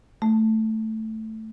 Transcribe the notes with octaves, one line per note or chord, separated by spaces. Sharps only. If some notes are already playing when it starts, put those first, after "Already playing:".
A3